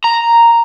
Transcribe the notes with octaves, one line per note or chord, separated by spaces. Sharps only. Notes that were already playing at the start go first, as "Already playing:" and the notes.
A#5